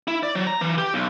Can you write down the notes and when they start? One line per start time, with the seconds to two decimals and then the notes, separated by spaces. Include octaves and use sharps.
0.08 E4
0.23 D5
0.35 F#3
0.47 A#5
0.61 E3
0.78 G4
0.94 B1